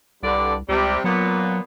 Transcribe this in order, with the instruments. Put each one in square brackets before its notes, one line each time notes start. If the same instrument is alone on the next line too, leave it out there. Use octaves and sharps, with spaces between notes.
[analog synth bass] C2 [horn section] G2 D3 D5
[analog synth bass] C#2 [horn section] C3 G3
[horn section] A#2 B3 [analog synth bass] F#3